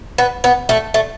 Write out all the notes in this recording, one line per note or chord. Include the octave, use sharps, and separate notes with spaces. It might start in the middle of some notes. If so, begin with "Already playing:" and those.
B3
B3
A3
A3